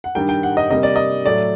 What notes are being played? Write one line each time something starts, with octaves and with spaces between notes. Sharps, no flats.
F#5
G2 D#3 G3 G5
G5
F#5
D#5
C3 G3 A#3 D#5
D5
D#5
A2 F#3 A3 D5